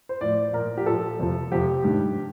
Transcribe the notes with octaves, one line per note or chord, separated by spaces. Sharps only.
C5
A2 F3 D5
A#2 F3 A#4
G4
A#2 F3 A4
F2 C3 F3
F2 C3 F3 G4
G2 D#3 G3